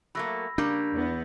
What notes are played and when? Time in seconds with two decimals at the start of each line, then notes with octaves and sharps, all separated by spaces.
0.15 F#3 A3 A#3 B5 E6 A#6
0.58 C#3 G3 A#3 D4 G6
0.93 E2 B3